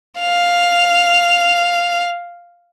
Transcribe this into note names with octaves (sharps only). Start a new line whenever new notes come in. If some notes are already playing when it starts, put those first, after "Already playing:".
F5 F7